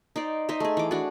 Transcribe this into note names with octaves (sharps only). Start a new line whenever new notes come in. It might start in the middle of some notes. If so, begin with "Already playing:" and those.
D#4 C5 D5
D#4 C5 D#5 E5
A3 G#4
E3 D6
D4 F#4